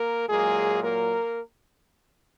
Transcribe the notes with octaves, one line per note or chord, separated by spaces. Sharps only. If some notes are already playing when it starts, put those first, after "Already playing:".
Already playing: A#3 A#4
A#2 F#3 G#3 A#3 G#4
A#3 A#4